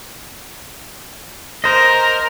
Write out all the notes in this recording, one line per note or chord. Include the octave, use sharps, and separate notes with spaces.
A#4 C5 D#5